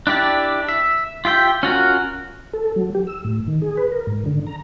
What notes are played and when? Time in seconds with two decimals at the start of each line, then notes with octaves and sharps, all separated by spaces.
0.07 D4 E4 G4 D5
0.69 E5
1.25 F4 G4 E5 G5
1.63 C#4 F4 F#4 A#4
2.53 A4
2.76 F#3
2.95 G4
3.07 E6
3.25 A2
3.47 D#3
3.62 G#4
3.77 B4
3.92 A#4
4.07 G#2
4.26 D3
4.47 A#5